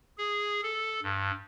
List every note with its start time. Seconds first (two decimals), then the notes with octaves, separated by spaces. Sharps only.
0.18 G#4
0.63 A4
1.03 G2